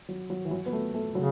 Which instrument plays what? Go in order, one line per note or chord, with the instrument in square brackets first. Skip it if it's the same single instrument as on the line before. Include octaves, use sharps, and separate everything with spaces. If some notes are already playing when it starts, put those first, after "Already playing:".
[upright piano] F#3
F#3
E3
F#3
B3
A3
A3
[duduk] C#3 [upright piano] F#3